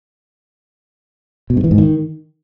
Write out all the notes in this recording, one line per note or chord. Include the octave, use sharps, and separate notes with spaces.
B2
G2
E3
G#2
D#3